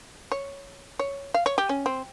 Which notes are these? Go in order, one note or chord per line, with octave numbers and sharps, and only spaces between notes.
C#5
C#5
F5
C#5
G4
C#4
C4